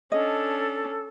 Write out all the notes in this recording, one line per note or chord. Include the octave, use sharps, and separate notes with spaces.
C#4 D4 A4 D#5